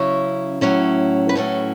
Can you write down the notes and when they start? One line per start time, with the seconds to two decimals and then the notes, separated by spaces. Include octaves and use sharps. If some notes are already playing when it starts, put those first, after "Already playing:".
Already playing: C#3 F#3 C#4 E4
0.61 A2 F#3 C#4 E4
1.29 B4
1.35 A2 F#3 C#4 E4 A4